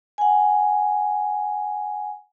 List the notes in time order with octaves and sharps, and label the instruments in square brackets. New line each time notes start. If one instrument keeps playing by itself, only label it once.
[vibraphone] F#5 G#5